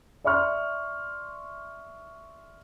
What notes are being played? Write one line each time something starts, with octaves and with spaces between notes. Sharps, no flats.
D5 E5 C6 C#6 F6